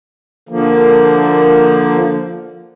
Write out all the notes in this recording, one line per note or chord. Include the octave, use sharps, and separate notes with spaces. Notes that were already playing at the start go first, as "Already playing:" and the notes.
D3 F3 A#3